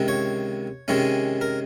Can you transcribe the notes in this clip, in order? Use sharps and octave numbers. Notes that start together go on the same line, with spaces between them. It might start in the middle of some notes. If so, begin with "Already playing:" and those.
Already playing: C#2 C3 D#3
C#5
C3 D#3 G#3 C#4
A#4